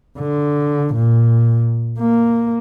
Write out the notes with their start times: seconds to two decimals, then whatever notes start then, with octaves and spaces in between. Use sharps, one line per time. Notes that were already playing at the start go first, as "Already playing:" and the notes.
0.19 D3
0.94 A#2
2.00 A#3